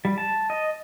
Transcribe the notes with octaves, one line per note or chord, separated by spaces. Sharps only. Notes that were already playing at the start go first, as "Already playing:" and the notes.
G3
A5
D#5